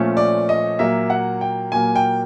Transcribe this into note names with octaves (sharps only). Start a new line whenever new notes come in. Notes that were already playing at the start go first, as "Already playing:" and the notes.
Already playing: A#2 F3 A3 C#4
D5
D#5
A#2 F#3 A#3 E5
F#5
G5
A#2 F#3 A#3 G#5
G5